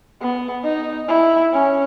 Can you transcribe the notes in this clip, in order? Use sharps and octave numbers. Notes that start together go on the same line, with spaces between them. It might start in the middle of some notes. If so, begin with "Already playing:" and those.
B3
D#4
E4
C#4